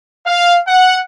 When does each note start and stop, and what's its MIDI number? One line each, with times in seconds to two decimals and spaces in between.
0.25 0.56 77
0.68 0.99 78